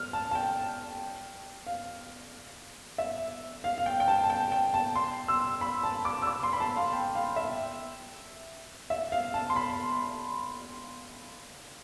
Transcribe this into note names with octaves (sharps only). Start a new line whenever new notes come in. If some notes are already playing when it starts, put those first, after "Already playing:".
Already playing: F6
A5
A5
G5
F5
E5
F5
F5
G5
G5
A5
A5
G5
G5
A5
C6
E6
B5
A5
D6
E6
D6
C6
B5
A5
F5
G5
F5
E5
E5
F5
A5
C6
B5